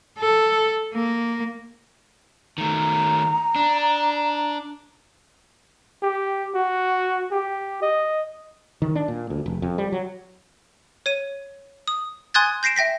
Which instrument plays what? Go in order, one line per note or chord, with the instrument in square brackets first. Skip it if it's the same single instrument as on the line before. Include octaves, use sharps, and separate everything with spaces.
[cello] A4
A#3
[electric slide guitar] D#3 A3 [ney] A#5
[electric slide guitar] D4
[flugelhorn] G4
F#4
G4
D#5
[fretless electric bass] D#3
D4
A#2
D2
F1
F2
G3
F#3
[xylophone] C#5 D#7
D#6
G#5 C6 D#6 F#6 G#6 A6
G6 A#6 C7 D7 E7
E5 G5 A#6 B6